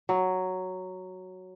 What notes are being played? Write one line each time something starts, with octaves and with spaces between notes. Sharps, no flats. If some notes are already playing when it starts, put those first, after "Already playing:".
F#3